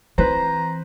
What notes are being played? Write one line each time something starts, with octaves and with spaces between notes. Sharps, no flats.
E3 C4 B4 C5 A#5